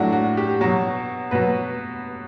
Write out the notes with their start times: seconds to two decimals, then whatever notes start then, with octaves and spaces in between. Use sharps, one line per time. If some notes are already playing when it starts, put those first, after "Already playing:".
Already playing: A2 F#3 D4 F#4
0.13 F#4
0.37 G4
0.61 B2 F#3
1.31 B2 F#3 B4